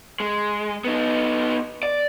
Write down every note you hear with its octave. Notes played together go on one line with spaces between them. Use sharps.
G#3
B3 D#4
D5